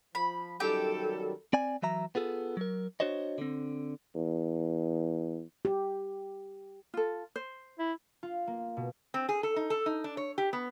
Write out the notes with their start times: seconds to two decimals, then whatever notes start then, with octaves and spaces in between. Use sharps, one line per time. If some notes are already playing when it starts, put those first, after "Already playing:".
0.15 F3 B5
0.60 F#2 D#3 G3 G4 A4 G5
1.53 C4 D5 G#5
1.82 E3 F#3 E5 A#5
2.15 B3 F4 G#4 A4
2.57 F#3 A#4
3.00 D4 F#4 C5 C#5 D#5
3.38 D3 C4
4.16 E2
5.65 G4
6.94 F4 A4
7.36 C5
7.79 E4
8.23 F4
8.47 A#3
8.77 B2
9.14 C4
9.29 G#4
9.43 A4
9.56 D#4
9.70 A4
9.86 D#4
10.04 D4
10.17 C#5
10.38 G4
10.53 B3